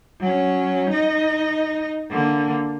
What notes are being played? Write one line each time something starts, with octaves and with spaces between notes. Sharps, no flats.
F#3 C#4
D#4 D#5
D3 A#3